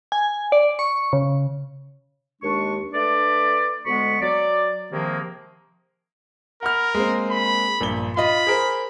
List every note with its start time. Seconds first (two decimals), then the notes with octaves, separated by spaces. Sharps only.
0.12 G#5
0.52 D5
0.79 C#6
1.13 C#3
2.42 D#2 G#3 D4 C#6
2.93 A3 D4 B4 D5
3.85 D2 G#3 B3 B5 C#6
4.21 F#3 D5
4.92 C3 D#3 F3 G#3 A#3
6.63 A#4 F#5 B5 F6
6.95 G#3 A#3 C4
7.30 B5
7.81 A#1 G2 G7
8.17 F4 D#5 B5
8.47 G#4 A#4 C5